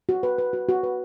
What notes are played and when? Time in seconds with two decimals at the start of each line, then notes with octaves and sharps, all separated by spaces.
0.09 F#4
0.23 B4
0.38 B4
0.53 F#4
0.69 F#4
0.83 B4